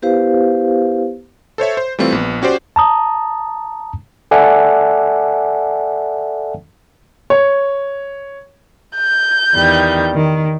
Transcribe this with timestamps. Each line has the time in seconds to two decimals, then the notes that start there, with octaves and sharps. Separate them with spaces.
0.02 B3 E4 G4 B4 C5 F5
1.58 A4 C5 C#5 E5
1.77 C5
1.99 E3 G3 A3 C4 F4
2.12 A#1 B3
2.42 C#4 F#4 G4 C5 D5
2.76 A5 A#5 D#6
4.31 A4 D5 E5 F#5 G#5 A5
7.30 C#5
8.96 G6
9.55 E2 D#3 G3
10.14 D#3